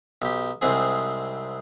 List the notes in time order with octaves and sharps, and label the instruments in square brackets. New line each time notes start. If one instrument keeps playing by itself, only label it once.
[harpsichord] B1 G4
C2 G#2 C4 G#4